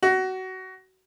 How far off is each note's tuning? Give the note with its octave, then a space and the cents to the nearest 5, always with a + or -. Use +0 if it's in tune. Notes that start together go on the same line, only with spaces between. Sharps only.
F#4 +20